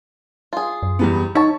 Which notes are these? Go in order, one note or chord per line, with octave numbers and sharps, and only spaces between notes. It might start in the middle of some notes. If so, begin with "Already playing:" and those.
F4 G#4
F#2
E2 G3 B3
D#4 C#5 A5 C#6